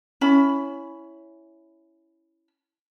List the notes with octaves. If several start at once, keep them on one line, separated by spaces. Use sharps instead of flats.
C#4 E4 B5